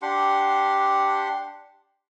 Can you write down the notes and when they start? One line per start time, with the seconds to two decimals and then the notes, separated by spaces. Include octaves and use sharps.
0.02 D4 G4 F#5 C6